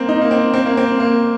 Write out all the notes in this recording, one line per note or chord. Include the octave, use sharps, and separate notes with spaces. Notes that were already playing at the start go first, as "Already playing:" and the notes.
Already playing: A#3 C4
D#4
A#3
C4
C4
A#3
C4
A#3